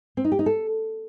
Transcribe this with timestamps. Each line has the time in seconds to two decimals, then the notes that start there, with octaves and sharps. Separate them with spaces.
0.17 C4
0.24 D#4
0.32 G4
0.39 D#4
0.46 A4